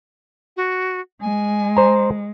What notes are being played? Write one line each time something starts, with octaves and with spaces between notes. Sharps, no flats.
F#4
G#3 G#5
C5 A#5